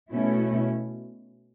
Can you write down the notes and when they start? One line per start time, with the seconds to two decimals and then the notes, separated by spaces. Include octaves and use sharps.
0.12 B2 A3 C#4 E4